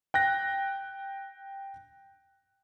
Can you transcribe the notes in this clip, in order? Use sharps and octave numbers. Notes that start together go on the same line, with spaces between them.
G5 F#6 A#6